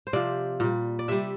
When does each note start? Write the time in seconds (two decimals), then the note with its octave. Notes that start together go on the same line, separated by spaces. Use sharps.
0.07 C5
0.13 C3 F3 D5
0.60 A#2 G3
0.99 D5
1.08 C3 G3 E5